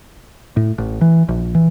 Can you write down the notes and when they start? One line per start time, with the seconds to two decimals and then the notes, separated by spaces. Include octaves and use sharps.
0.57 A2
0.78 A1
1.01 E3
1.29 A#1
1.55 E3